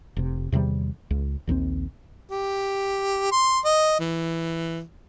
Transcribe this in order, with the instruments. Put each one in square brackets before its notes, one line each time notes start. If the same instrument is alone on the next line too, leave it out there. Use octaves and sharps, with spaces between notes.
[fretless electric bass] F1 C3
E2 C3 D#3 G3
C#2
A#1 D#2 F3 C4
[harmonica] G4
C6
D#5
E3